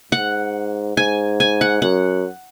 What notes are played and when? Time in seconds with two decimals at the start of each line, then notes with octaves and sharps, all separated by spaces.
0.12 G#2 F#5
0.97 G#2 G#5
1.40 G#5
1.61 F#5
1.82 F#2 F#5